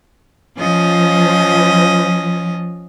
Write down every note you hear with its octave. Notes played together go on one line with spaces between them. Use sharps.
F3 C#4 D#5